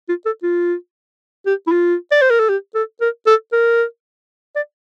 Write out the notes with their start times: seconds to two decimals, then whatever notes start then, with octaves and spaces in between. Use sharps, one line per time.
0.09 F4
0.26 A4
0.43 F4
1.46 G4
1.67 E4
1.72 F4
2.12 D5
2.22 C5
2.30 A#4
2.40 A4
2.49 G4
2.75 A4
3.01 A#4
3.27 A4
3.53 A#4
4.56 D5